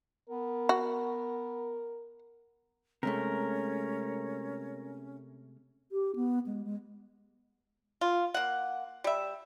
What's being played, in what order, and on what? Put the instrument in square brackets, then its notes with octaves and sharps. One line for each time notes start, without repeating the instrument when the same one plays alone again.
[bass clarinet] B3 [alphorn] A#4
[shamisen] F#4
[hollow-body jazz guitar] C3 G#3 A3 [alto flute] C#4 [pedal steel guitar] A#4
[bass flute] G4
B3
G#3
G#3
[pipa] F4
A#3 F#5
G3 E5